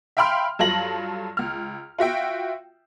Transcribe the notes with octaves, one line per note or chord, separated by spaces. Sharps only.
E5 F5 G5 B5 C6 F6
G2 F#3 F4 A4 A#6 F#7
C#2 F6
F4 F#4 E5 G5